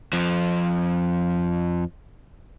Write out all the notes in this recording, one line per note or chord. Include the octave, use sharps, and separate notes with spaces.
F2 F3